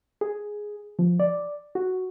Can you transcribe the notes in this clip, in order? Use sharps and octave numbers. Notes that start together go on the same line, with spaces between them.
G#4
F3
D5
F#4